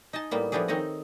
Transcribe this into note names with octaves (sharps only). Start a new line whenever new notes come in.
D#4 D#5 G#5 A5
A2 G3 A#3 B3
F3 A3 B3 D4 G4 G#4
D#3 C4 D#4 C#5 D#5